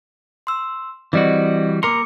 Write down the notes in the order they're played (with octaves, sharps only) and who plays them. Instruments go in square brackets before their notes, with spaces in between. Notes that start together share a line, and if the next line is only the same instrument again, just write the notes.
[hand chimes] C6 E6
[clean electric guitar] E3 G3 F#4 [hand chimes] C4 D5 D#5
[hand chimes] A#3 D6 C#7 [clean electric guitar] A#4 A#5 C6